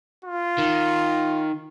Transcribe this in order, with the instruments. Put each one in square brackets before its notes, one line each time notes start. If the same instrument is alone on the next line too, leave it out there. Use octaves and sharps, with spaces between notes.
[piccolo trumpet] F4
[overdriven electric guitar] D#3